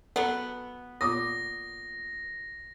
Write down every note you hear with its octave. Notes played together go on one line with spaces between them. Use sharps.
F#3 B3 A4
A#2 D6 D#6 A#6